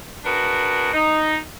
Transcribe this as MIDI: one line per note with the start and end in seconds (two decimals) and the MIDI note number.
0.25 0.90 62
0.25 0.90 66
0.25 0.90 68
0.25 0.90 70
0.25 0.90 71
0.93 1.38 63